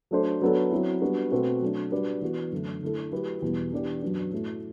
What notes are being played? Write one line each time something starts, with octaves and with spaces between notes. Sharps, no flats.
F#3 A3 D4 A4 C5
F#3 B3 D4 A4
F#3 C4 E4
G3 B3 D4 F#4
B2 A3 C4 F#4 B4
F#3 A3 D4
G3 D4 F#4 B4 D5
E3 B3 F#4
F#2 D3 A3
D3 A3 E4 A4
F#3 A3 E4 G4 B4
E2 B2 G3 B3
E3 B3 D4 G4 D5
F#2 F#3 B3 D4
A2 F#3 A3